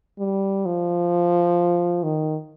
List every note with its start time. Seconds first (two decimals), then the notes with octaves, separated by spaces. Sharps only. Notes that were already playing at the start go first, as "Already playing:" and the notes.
0.19 G3
0.65 F3
2.03 D#3